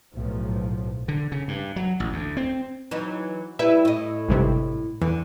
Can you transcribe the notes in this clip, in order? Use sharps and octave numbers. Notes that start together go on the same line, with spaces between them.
B1 A2 F3
D3
C#3
G2
F#3
A1
D2
C4
E3 F#3 D#4
G3 E4 B4 E5
A2 D#5
G#1 G2 C3
E2 D3